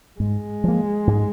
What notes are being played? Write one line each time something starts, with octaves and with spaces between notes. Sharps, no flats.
G#2 G#3
F3 A#3
G#2